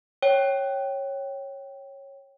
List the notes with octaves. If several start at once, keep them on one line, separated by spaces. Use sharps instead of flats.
C#5 G5